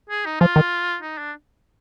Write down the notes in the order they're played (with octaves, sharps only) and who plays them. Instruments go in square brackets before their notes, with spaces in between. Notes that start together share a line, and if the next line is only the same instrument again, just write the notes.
[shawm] G#4
D#4
[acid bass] F3 [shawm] F4
[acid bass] D#3
[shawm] D#4
D4